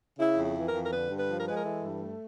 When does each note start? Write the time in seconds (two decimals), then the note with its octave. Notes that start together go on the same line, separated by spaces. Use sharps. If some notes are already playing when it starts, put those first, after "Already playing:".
0.19 C#3 E4
0.38 F2
0.43 E4
0.57 E3
0.69 F2 A#4
0.84 A#4
0.92 D3 B4
1.10 G2
1.17 B4
1.29 F3
1.40 A#4
1.47 G#3 B4
1.56 A#4
1.64 E3 A4
1.82 G2
2.01 A3